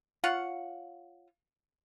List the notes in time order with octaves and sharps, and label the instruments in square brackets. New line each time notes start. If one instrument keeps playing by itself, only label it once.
[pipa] F4 C#5 F5 F#5